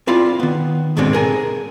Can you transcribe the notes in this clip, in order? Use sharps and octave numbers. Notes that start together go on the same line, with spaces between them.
C4 E4 F4 D5 F5 B5
D#3 B3
D#2 G#2 B2 D3 G#3 C4
G#4 A#4 G#5